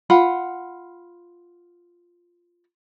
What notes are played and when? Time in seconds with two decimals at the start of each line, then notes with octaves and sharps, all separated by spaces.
0.10 F4 F#5 B5